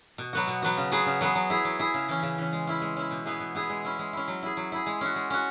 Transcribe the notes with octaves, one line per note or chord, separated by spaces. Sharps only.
B2
F#3 B3 F#4
B2
F#3 B3 F#4
C#3
F#3 B3 G#4
C#3
F#3 B3 G#4
F#3
E4 G#4
F#3
E4 G#4
C#3
E3 C#4
C#3
E3 C#4
G#3
C#4 E4
G#3
C#4 E4
B2
B3 E4 G#4
B2
B3 E4 G#4
G#3
C#4 E4
G#3
C#4 E4
F#3
E4 G#4
F#3
E4 G#4
G#3
C#4 F#4
G#3
C#4 F#4